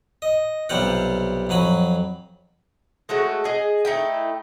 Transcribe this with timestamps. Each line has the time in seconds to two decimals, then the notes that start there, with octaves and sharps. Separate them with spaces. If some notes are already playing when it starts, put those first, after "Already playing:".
0.22 D#5
0.69 B1 C3 G3 F4 C5 F#5
1.49 F2 F#3 G#5 B5
3.09 G#3 A3 F#4 C#5
3.45 G#4 D#5
3.85 A3 D#4 E4 G5